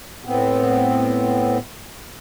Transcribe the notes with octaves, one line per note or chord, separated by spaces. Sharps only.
A2 B3 C4